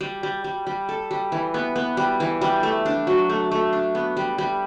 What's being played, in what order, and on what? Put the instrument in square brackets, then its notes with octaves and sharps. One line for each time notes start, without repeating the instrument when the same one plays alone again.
[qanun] G3
G3
G3
G3
A4
G3
E3
B3
B3
G3
E3
G3
A3
D4
F#3
A3
A3
D4
B3
G3
G3